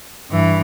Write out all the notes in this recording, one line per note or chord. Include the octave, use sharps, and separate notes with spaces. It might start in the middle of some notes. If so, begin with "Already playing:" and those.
G2 E3